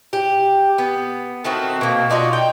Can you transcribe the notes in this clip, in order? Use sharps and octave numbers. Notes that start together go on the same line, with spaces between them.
G4
B3
D#3 A3 C4 F#4
B2 A#3
D4 D#4 F4 F#4
G5